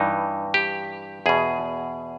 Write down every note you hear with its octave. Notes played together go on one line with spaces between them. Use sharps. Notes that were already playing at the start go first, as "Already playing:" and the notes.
Already playing: G2 E3 D#4
G4
E2 B2 G#4